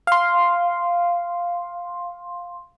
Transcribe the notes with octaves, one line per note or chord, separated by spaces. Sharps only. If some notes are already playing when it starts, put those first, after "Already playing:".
F5 C6